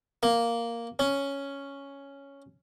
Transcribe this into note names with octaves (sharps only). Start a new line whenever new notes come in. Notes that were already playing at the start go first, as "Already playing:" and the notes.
A#3
C#4